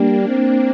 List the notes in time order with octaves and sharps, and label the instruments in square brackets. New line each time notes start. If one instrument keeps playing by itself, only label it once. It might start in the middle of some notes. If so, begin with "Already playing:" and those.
Already playing: [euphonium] G3 [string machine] A#3 D4
[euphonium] C4